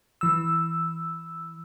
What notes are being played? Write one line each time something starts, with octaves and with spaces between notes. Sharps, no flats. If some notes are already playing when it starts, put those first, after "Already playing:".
E3 E6